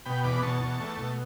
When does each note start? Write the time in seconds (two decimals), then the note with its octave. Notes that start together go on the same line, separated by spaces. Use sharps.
0.05 B2 G5 B5
0.24 E2 B5 D6
0.43 B2 A5 C#6
0.61 E2
0.80 A3
0.98 B2